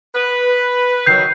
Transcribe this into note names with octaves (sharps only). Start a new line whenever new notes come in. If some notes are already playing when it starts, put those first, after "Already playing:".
B4
D#3 F#3 G6 C7